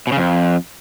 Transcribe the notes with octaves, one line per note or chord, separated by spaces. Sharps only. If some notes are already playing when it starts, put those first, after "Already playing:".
B2
C#3
F2